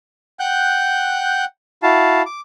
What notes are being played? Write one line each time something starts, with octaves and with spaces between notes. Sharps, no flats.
F#5 G5 F#6 G6
E4 F#4 F5 A5
D6